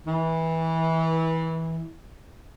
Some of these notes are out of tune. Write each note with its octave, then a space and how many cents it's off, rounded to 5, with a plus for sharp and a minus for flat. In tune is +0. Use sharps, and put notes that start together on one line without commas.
E3 -20